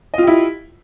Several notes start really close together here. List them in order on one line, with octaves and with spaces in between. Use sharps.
D#5 F4 G4 E4